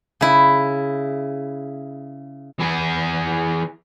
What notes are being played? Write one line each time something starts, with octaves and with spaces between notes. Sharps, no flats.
C#3 E4
E3 G#4